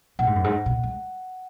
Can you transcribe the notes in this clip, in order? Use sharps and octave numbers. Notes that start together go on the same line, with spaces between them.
A#2 F#5
G#2
F#2
G#2
A#2
G#3